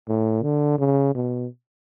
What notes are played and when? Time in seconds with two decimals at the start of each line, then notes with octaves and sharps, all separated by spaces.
0.08 A2
0.43 D3
0.79 C#3
1.15 B2